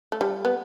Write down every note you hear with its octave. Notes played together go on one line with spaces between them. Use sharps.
A3
G3
B3